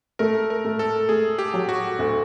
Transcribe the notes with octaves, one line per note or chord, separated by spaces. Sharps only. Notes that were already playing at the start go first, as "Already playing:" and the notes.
A3 A#4
A#4
A3
A4
A3 G#4
G4
F#3
F#4
D2